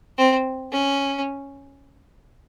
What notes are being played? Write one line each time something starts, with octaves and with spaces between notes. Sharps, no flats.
C4
C#4